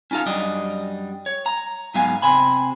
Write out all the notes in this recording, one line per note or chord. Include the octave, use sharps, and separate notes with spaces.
C#4 D#4 F4 A4 F5
F#2 G3 D4 D#5
C#5
A#5
G#2 F#3 B3 F#4 F5 G#5
C3 C5 G#5 B5